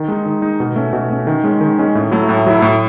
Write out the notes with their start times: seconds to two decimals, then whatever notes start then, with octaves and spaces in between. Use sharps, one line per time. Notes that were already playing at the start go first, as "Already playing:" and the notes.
Already playing: D#3
0.08 G#3 D#4
0.26 D#3
0.42 G#3 D#4
0.60 B2
0.76 A3 C#4
0.93 B2
1.10 A3 C#4
1.27 D#3
1.44 G#3 C#4
1.61 D#3
1.79 G#3 C#4
1.95 A2
2.11 F#3 A3 E4
2.29 A2
2.46 F#3 A3 E4
2.62 A2